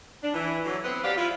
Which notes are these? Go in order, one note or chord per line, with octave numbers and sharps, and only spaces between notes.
D4
E3
D3 E3 F#3
B3 C4 B4
F#3 G4 D5 F5
E4 F4